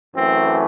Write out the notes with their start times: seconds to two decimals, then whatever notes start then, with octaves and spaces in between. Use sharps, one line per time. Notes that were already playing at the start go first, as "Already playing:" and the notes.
0.14 F#2 E3 A3 C4